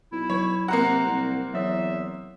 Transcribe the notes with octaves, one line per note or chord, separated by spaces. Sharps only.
B1 E4
F#3 B4 C#5
C3 A#3 C4 F#5 A#5
C2
E2 F#3 C#5 E5 D#6